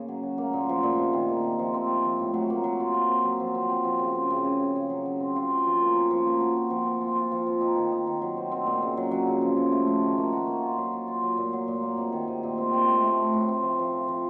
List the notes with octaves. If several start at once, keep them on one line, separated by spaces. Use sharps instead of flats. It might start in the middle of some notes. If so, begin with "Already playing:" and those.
Already playing: C#3 A#3
F#3
F#3
A#3
A#2
F3
A#2
C3
D#3
A#3
C3
F3
C4
F3
F3
A2
F#3
A#3
F#3
F4
F4
C4
F#3
F3
C4
C4
F3
C#3
C4
C#3
C#3
C#3
C#3
F#3
F#3
C4
F4
F4
F3
A#3
C#4
F3
A#3
F#4
C4
F3
C4
F4
F4
F3
C4
D#4
D#3
D#4
D#3
F#3
C4
C4
A#2
C#3
F#3
F#3
C#3
F3
F3
A3
F3
D#3
A#3
F#4
A#3
F4
F#3
F4
F4
F#3
A#2
F#3
A#2
A#3
C3
D#3
C3
A#2
C4
C4
A3
A3
A3
A2
C4
F3
F3
F3
F3